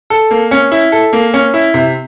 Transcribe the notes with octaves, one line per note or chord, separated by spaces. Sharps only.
A4
A#3
C#4
E4
A4
A#3
C#4
E4
C3